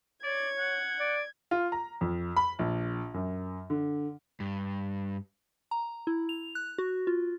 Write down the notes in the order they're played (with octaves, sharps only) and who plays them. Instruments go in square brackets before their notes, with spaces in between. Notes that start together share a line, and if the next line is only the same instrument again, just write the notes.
[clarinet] C#5 [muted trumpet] D5 [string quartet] G#6
[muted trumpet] F#5
[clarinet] D5
[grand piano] F4
A#5
F2
B5
A#1
F#2
D3
[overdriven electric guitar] G2
[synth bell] A#5
E4
F7
F#6
F#4
F4